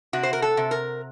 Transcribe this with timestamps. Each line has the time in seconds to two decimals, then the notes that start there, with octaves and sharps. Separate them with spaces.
0.13 C3 F#4
0.23 C5
0.33 A#4
0.42 A4
0.57 C3
0.71 A#4